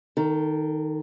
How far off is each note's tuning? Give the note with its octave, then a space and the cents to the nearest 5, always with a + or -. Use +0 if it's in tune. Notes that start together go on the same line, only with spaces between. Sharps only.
D#3 +0 A4 +30